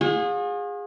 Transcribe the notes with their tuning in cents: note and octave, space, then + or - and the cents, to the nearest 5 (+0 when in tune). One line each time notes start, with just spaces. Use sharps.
F4 +45 G#4 -20